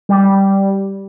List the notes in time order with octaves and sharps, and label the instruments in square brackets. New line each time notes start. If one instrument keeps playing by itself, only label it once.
[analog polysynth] G3